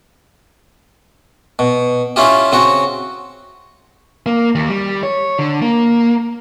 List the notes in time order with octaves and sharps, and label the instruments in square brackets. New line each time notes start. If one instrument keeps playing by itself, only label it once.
[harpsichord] B2
C#4 E4 F4 G4
C#3 C4 F#4
[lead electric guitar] A#3
D#2
G3
C#5
D3
A#3